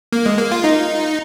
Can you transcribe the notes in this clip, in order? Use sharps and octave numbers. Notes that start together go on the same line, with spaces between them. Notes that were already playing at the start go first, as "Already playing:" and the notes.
A#3
G#3
A#3
F4
D#4